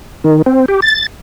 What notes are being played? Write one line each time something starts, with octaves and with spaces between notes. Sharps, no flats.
D#3
C4
G4
A6